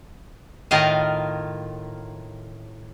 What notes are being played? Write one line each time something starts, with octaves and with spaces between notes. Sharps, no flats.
A2 D#3 F4 A#4 D#5 F5